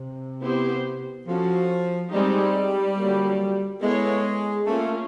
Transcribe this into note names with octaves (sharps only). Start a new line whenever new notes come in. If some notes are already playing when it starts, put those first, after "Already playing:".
Already playing: C3
B3 E4 G4 C5
F3 C#4 F#4 A4
G3 G#3 C4 D#4 G4
D3 F#3 A#3
G#3 B3 E4 A4 C#5
A3 A#3 C#4 F4